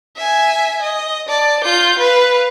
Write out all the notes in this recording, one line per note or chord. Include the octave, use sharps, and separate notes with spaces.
E5 G#5
D#5
D5 A5
F4 G6
B4 F5